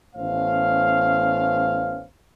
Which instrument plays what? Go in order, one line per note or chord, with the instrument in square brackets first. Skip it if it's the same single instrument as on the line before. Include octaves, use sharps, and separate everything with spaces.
[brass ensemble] A1 A3 B3 C#4 C5 F5